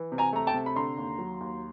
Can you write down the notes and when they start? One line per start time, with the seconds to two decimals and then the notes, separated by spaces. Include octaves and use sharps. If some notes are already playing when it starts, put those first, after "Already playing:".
Already playing: E3
0.12 C3
0.18 G#5 A#5
0.33 A3 A#5
0.47 G5 A5
0.54 C3
0.66 B5
0.76 D3 A#5 C6
0.98 D#2
1.18 F#3
1.40 D#2